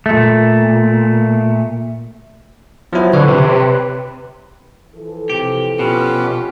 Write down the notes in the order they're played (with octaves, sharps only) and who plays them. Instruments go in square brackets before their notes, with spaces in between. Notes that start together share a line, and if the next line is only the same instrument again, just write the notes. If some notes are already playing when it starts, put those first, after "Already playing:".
[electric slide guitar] A#2 A3
[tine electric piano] F3 F#3 E4 [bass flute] B3
[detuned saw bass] D3 [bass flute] B4 [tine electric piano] C#5
[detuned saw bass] C3
[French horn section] E3 F3 A4
[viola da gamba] C3 [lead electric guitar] G4
[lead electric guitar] B2 [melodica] C#4 B4 [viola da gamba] F4 G4